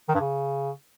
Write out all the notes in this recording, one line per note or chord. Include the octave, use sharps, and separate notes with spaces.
D#3
G2
C#3